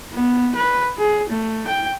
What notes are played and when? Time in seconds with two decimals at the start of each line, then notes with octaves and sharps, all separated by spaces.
0.12 B3
0.56 B4
0.98 G#4
1.30 A3
1.67 G5